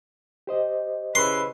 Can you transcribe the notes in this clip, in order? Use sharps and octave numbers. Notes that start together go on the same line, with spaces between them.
G4 C5 D#5
C#3 E4 B4 C6